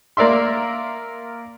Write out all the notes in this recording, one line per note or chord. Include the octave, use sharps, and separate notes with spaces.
A#3 A#4 D5 E5 C6